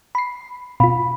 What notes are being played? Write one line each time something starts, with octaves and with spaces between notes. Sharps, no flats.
B5 C7
B2 F4 B5